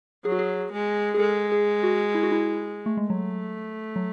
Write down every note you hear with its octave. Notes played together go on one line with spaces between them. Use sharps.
F#3 G#4
F#4
G#4
G#3
G#4
G#3 A4
G#4
F#4
E4
F#4
E4
A3
G#3
F#3 A3
F#3